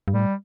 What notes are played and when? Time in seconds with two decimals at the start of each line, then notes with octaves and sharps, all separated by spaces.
0.08 G2
0.13 A2 G3